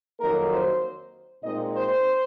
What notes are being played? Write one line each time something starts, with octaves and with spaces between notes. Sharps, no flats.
F2 D#3 F#3 A#3 D#4 A#4
C5
A#2 G#3 C4 D#4 D#5
C5